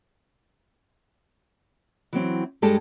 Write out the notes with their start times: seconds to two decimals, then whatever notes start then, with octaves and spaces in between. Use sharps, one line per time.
2.13 E3 F#3 C4
2.62 G2 G#3 G4 A4 A5